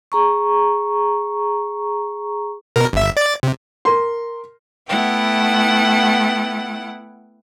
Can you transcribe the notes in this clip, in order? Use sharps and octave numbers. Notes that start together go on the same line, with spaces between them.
G#4 A#5 C#6
B2 A#4
G1 E5
D5 A6
C3
A#4 C6
A3 B3 E4 F#5 G5